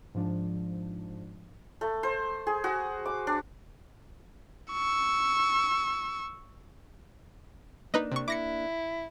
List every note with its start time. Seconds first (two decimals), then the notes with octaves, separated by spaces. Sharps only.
0.15 G#2 F3 D4
1.81 A3
2.03 C5
2.47 G#4
2.64 F#4
3.06 D6
3.27 D4
4.72 C#6 E6
7.94 A#3 D4 D#4 B4 D#5
8.12 C3 C#6
8.28 E4 D6 A#6 C#7